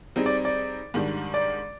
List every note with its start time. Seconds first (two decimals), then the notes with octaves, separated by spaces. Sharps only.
0.16 G3 C4 D#4 G#4
0.26 D5
0.45 D5
0.94 G#2 D#3 G3 D4
1.34 D5